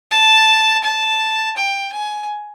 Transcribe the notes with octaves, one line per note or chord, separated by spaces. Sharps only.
A5
A5
G5
G#5